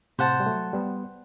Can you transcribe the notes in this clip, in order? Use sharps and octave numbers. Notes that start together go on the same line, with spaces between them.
A2 C3 C5 F#5 A5
G3
F#3 A3
G3 B3